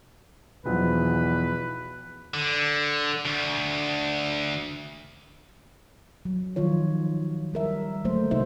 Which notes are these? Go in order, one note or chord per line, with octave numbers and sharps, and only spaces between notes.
B1 E2 F3 B4
D3
D2
F#3
D#3 F3 F#3 F4 C#5
G3 A#4 E5
D3 F#3 A3 A#3 C5
C3 A#3 D#4 F#4 C5 E5